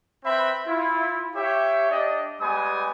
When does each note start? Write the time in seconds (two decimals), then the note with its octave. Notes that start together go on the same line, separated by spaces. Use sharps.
0.25 C4 B4 E5 G5 B5
0.66 E4 F4
1.35 G4 C#5 E5
1.90 D4 G4 D5 D#5
2.40 G3 G#3 B3 B4 G#5 D#6